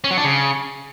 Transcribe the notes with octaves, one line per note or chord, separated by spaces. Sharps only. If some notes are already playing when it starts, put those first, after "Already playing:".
C#4
F#3
D4
C#3